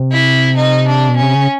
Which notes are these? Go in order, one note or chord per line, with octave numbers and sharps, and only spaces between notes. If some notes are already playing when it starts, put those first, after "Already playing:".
Already playing: C3
E4
D#4
D4
B2
C3 C#4
C#3